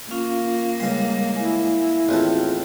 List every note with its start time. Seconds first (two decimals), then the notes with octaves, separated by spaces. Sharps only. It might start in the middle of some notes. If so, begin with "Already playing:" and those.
0.11 A#3 C#4 F4 F5
0.80 C#2 G3 C6
1.36 E4 G#5
2.09 A1 D#2 C4 F4 G#4 A4